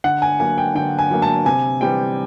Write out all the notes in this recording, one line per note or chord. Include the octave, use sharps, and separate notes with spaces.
D3 F#5
G#5
F#3 A#3 G#5
G5
D3 G5
G#5
F#3 A#3
A5
C3 G#5
E3 G3 C4 G5